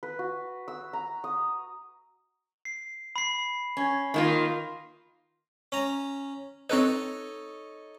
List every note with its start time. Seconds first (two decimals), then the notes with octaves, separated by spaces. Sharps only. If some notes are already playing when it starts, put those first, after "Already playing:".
0.03 B4
0.19 F#4
0.68 E6
0.93 A#5
1.24 D#6
2.65 C7
3.16 B5 C7
3.77 C#4
4.14 D#3 A#3 F4
5.72 C#4 A#5
6.70 C4 D#4 A4 B4 C#5